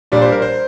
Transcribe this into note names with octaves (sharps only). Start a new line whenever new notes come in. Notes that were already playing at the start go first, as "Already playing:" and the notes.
A#2 G3 D4 D5
C5
A#4
C5